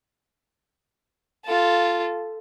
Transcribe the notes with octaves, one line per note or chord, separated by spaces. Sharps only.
F4 A4